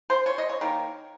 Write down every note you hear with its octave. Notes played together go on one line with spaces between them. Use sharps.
C5
C#5
D#5
C#5
D#3 A#3